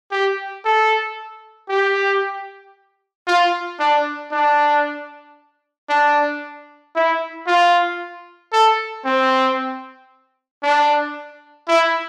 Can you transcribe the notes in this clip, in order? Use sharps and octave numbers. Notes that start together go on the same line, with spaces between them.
G4
A4
G4
F4
D4
D4
D4
E4
F4
A4
C4
D4
E4